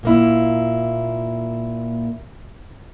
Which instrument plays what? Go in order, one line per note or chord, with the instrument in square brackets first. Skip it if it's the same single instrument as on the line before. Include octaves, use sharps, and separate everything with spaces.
[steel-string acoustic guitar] A#2 A#3 E4